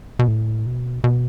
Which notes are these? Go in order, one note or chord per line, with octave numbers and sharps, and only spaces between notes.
B2
A2
B2
B2